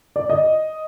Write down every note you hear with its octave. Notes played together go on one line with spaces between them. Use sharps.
D5
D#5